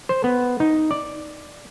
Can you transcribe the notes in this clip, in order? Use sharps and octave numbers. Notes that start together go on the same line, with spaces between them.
C5
B3
D#4
D5